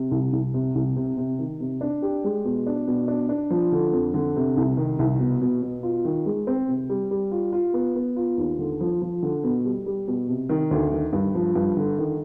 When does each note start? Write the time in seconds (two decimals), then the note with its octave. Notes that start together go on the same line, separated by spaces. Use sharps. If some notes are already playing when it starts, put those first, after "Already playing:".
Already playing: C3
0.11 C2
0.33 C2
0.54 C3
0.75 C2
0.96 C3
1.18 C3
1.39 D#3
1.60 C3
1.81 D4
2.02 G4
2.24 G#3
2.44 B2
2.66 D4
2.87 B2
3.08 D4
3.29 D4
3.50 F3
3.72 D3
3.93 F2
4.14 D3
4.36 C3
4.57 C2
4.77 D#3
4.99 C2
5.20 B2
5.41 B2
5.62 B2
5.83 F4
6.05 D#3
6.26 G#3
6.47 C4
6.68 C3
6.89 G3
7.11 G3
7.31 F4
7.52 F4
7.74 B3
7.95 B3
8.16 F4
8.38 D#2
8.59 D3
8.80 F3
9.02 F3
9.23 D3
9.44 B2
9.65 G3
9.86 G3
10.07 B2
10.29 C3
10.49 D#3
10.71 D2
10.92 D#3
11.13 G2
11.34 F3
11.55 G2
11.77 D3
11.98 D#3